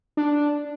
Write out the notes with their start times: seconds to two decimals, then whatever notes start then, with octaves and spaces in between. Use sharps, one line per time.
0.17 D4